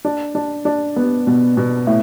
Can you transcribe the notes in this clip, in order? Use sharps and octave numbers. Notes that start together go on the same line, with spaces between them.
D4
D4
D4
B3
B2
B2
A2